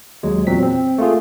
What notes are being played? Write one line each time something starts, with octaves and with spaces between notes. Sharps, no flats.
D#2 F#3 G#3
E2 A#2 F#3 C4 B6
C4
A3 A#3 F4 G#4